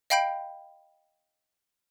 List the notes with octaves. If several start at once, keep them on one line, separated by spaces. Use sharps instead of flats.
D#5 F5 G5 B5 G6 D7